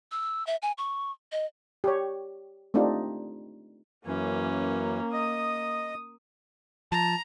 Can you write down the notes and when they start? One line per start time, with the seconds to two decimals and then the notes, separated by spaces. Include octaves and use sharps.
0.12 E6
0.47 E5
0.62 G#5
0.78 C#6
1.32 D#5
1.84 G4 C#5
2.74 A3 C4 D4 D#4 F4 G4
4.06 F#2 E3 A#3 C#4
5.13 D#5 D#6
6.92 F3 A5 A#5